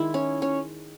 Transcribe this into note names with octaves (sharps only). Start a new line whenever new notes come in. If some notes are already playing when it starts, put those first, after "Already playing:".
Already playing: D#3 G#3 E4
C#4
C#4